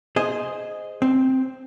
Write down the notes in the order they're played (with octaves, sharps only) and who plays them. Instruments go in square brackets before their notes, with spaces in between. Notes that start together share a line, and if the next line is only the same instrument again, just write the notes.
[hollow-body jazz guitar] G#4 C5 D#5
C4